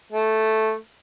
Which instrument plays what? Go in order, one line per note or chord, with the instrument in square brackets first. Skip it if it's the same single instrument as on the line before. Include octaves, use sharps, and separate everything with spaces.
[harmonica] A3